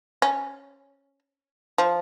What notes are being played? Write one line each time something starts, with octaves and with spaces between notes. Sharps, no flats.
C#4
F3